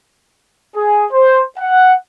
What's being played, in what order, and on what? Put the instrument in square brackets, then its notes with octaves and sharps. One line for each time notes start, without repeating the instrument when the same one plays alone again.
[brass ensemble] G#4
C5
F#5